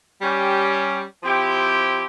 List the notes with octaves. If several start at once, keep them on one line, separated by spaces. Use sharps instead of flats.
G3 C#4 G4
F3 C4 E4 G4